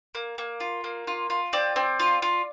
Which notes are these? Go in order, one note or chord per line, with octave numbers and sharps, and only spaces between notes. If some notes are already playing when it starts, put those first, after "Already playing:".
A#3
A#3
F4
A#3
F4
F4
C4 D5
C4
F4
F4